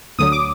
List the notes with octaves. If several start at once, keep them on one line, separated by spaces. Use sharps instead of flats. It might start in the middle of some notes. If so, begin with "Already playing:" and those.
D2 D3 F#3 D#6
D6